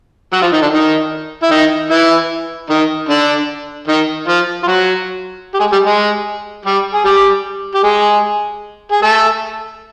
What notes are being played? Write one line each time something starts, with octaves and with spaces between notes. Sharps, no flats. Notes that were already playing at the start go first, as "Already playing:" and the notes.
F#3 F#4
F3 F4
D#3 D#4
D3 D4
D#3 D#4
E4
D#3 D#4
E3 E4
D#3 D#4
D3 D4
D#3 D#4
F3 F4
F4
F#3 F#4
G4
G#3 G#4
G3 G4
G#3 G#4
G3 G4
G#4
G3 G4
G4
G#3 G#4
G#4
A3 A4